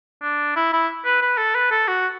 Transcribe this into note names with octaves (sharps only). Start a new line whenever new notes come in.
D4
E4
E4
B4
B4
A4
B4
A4
F#4